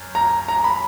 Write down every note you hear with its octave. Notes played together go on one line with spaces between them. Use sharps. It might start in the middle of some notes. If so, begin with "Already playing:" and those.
Already playing: F#2
A#5
A#5
B5